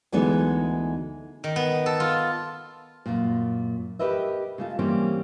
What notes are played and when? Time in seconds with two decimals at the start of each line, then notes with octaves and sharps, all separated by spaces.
0.12 D2 E3 G#3 B3 D#4
1.44 D#3
1.56 B3
1.86 A4
2.00 F4
3.06 F#2 A#2
3.99 G4 G#4 A#4 B4 D#5 E5
4.58 C#3 A3 F4
4.79 E3 G3 A#3 C4 C#4